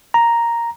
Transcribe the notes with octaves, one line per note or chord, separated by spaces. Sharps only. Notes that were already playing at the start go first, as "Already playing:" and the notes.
A#5